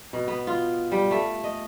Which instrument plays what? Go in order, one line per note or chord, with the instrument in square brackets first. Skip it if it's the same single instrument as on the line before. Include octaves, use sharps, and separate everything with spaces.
[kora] B2
B3
F4
G3
A3
D#5